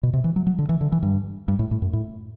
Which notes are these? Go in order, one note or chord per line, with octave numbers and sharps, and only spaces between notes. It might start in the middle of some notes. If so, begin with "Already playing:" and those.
B2
C3
E3
F#3
F#3
D3
E3
D3
E3
G2
G2
A2
A2
F#2
A2